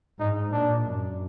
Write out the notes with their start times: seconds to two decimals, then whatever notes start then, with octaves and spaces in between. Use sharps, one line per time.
0.19 G#2 D#4
0.52 A#2 D4
0.85 F#2